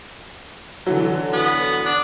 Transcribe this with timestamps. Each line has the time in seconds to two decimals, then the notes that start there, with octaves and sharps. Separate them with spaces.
0.86 D3 E3 F#3
1.33 B3
1.86 D4